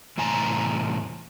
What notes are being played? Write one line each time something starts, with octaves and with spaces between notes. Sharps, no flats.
E2 A2 C3 G#5 A#5